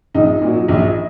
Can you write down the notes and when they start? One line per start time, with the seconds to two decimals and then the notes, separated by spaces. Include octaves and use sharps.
0.14 A#1 D#4
0.41 A#2 F#3
0.68 A#1